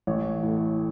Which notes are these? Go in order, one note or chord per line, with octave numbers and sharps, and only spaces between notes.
A1 C#5
A2